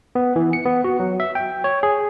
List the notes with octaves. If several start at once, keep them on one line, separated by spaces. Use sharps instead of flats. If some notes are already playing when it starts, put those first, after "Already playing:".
B3
E3
C#7
B3
F#4
F#3
E5
G5
C#5
G#4